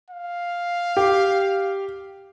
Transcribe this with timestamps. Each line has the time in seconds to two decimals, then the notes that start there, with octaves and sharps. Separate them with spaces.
0.10 F5
0.97 G4